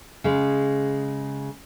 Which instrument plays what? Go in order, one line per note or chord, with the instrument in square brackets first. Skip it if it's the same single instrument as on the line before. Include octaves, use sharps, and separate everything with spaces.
[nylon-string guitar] C#3 G#3